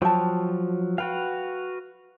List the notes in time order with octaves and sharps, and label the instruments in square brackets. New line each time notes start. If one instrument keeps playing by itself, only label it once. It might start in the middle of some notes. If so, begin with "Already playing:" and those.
[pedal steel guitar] F3 F#3 [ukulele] G5 A5
[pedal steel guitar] F#4 B4 F5 [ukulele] G5